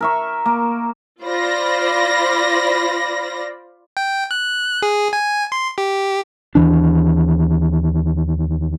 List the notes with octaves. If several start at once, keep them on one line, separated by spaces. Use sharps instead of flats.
A#4 E5 C#6
A#3
F4 C5 D5 B5 A#6
G5
F#6
G#4
G#5
C6
G4
D#2 E3 D4